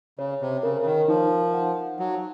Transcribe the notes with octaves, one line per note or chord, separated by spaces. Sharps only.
C#3 C#5
C3
C#3 A#4
C#3
D#3
F3 D#4
F#5
F#3 F#5